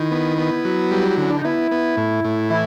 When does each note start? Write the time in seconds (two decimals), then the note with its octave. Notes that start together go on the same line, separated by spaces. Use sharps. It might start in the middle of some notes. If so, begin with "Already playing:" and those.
Already playing: D#3 E4
0.11 B3
0.38 B3
0.65 F#3
0.91 G3
1.17 D3 C#4
1.30 D4
1.37 D#4
1.44 B3 E4
1.71 B3
1.97 A2
2.24 A2
2.50 E3 E4